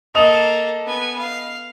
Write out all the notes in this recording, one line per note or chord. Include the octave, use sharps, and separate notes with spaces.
A#3 A4 D#5 D#6 F7
B3 G#5
F5